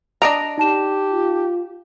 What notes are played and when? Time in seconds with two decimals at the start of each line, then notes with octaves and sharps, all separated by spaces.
0.22 D4 D#5 A#5 A#6 D7 F7
0.58 D#4 G4 A5 E7
1.13 F4